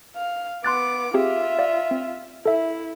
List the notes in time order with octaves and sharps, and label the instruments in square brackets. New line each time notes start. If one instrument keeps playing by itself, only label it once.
[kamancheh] F5
[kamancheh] B3 D6 [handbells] C6 F#6 A6
[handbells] C4 G4 G#4 [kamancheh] F4 E5
[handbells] D5 F5
C4
[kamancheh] E4 [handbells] A4 E5